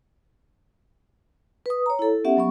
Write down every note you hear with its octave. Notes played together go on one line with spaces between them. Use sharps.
B4 D#6
C#5 A#5
E4 A4
B3 C#4 G4 E5 F#5
F#3 B3 C#6